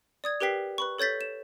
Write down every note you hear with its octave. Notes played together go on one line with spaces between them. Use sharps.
D5 D#6 G#6
G4 A#4 B4 G5 B6 C7
B4 B5 C#6
A4 C#5 G6 A6 B6
E7